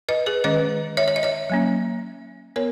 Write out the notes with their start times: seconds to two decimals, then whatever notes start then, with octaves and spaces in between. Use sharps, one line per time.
0.09 B4 D#5
0.26 G#4 B4
0.44 D#3 G#3 C#4 B4 D#5
0.97 C#5 E5
1.08 C#5
1.16 D#5
1.23 C#5 E5
1.50 F#3 A#3 C#4
2.56 B3 A#4 C#5